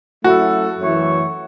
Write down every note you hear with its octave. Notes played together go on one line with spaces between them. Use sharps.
F#3 A3 C#4 E4 F#4 A4
F#2 E3 A3 E4 C#5